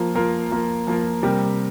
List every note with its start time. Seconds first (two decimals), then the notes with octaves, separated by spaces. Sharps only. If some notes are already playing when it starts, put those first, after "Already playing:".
Already playing: F3 A#3 F4 A#4
0.15 F3 A#3 F4 A#4
0.50 F3 A#3 F4 A#4
0.87 F3 A#3 F4 A#4
1.23 C3 G3 C4 G4 A#4